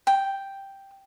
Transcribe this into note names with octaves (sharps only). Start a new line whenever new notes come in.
G5